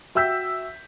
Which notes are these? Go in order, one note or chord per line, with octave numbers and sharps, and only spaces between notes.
F#4 E5 G5 E6 G6 B6